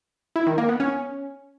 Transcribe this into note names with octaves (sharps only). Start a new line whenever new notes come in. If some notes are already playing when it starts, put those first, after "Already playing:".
E4
D#3
A#3
B3
C#4